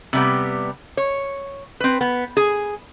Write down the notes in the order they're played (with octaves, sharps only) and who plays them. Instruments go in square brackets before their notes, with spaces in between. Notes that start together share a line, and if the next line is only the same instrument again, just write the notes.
[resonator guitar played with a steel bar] C3 G3 B3
C#5
C4 B4
B3
G#4